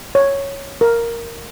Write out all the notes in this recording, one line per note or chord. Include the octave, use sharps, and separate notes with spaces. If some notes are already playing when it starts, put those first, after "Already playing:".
C#5
A#4